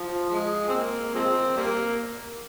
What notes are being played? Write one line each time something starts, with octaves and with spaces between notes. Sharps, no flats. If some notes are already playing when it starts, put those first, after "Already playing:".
Already playing: F3
F3 G#3
C4
A#3
F3 G#3 C4
G3 A#3